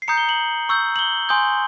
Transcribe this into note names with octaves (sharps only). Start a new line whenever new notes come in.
C7
A#5 D#6 G6 C#7
G7
F#7
C#6 E6 G6
F#7
G7
G#5 C6 D#6 G6